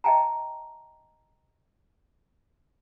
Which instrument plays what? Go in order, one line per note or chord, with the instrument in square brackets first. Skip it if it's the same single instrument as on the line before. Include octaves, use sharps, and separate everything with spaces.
[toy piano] D#5 E5 G5 A5 A#5